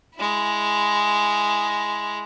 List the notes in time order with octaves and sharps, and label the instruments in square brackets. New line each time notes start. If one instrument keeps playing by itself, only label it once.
[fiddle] G#3 E4